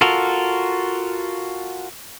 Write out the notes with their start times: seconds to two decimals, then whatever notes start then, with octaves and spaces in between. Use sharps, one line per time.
0.01 F4 F#4 A4 A#4